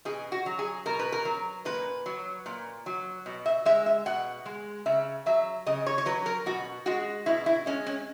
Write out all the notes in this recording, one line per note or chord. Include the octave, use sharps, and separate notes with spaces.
B2 G#4
F#4
F#3
G#4
B2 A#4
B4
A#4
F#3
A#2 B4
F#3
A#2
F#3
B2
E5
G#3 E5
E5
B2 F#5
G#3
C#3 E5
F#3 E5
C#3 D#5
C#5
C#5
F#3 B4
A#4
B2 F#4
G#3 F#4
B2 E4
E4
G#3 C#4
C#4